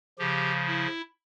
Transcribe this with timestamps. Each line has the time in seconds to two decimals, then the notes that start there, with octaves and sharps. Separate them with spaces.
0.18 C#3 F3 G4
0.67 E4